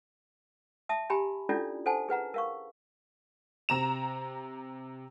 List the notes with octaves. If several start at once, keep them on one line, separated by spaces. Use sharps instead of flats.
E5 A5 D#6
G4 G#5 A#5 B5
C#4 D4 E4 F4 A4 D5
A4 C5 F#5 G#5 A5
G#4 B4 F#5 A#5
A#4 F5 C#6
C3 A#5 E7